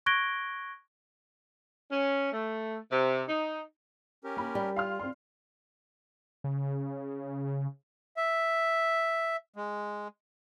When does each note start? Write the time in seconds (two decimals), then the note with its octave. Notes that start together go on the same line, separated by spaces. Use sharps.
0.06 C#6 F#6 G#6 A#6 D7 G7
1.91 C#4
2.32 A3
2.90 C3
3.27 D#4
4.24 C#4 G4 A#4
4.37 A#3 B5
4.55 G3
4.76 F4 F5 C6 F6
5.00 C4 C6
6.44 C#3
8.17 E5
9.56 G#3